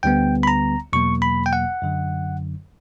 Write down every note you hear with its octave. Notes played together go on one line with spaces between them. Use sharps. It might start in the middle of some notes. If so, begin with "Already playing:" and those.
D2 D3 G3 B3 G5
B5
A#5
E2 B2 F#3 A#3 C#6
B5
G5
F#5
F#2 D3 F#3